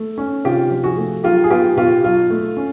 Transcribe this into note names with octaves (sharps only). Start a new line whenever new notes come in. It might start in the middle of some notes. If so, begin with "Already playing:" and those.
Already playing: A3
C#4
C3 F4 G4
F3
F#4 G#4
A3
F#3 F4 G4
G#4
B3 F4 G4
B2 F4 G4
F#3 F4
A3
C#4